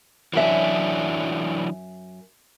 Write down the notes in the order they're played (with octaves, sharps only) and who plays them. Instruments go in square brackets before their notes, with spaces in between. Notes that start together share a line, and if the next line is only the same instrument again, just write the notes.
[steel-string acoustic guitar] F#2 E5 [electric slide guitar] E3 F#3 D4